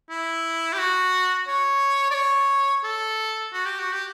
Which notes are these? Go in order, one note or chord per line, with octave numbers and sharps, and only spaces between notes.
E4
G4
F#4
C#5
D5
C#5
A4
F#4
G4
F#4
G4